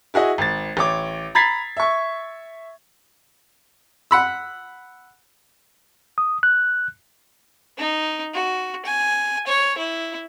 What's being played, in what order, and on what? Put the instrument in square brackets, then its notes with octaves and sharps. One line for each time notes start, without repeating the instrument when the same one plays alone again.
[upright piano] E4 F#4 G#4 D#5
G#1 A6
A1 C#5 D6
A#5 B5 G#6 A6 B6 C7
E5 C#6
[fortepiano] F#5 B5 E6
[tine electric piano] D#6
F#6
[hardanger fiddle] D#4
F#4
G#5
C#5
E4